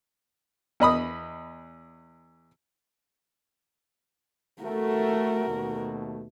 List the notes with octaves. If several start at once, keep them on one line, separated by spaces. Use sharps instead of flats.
E2 D#5 B5 D#6
A3 F#4 A#4
D#2 B2 A3